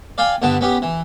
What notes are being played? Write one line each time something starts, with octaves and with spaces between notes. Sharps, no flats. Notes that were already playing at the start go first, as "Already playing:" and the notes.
D5 F5 G5 G#5
G2 D3 B3 A5
B3 C#4 G4
E3